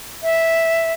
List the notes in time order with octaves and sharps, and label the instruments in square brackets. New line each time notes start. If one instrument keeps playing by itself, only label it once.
[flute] E5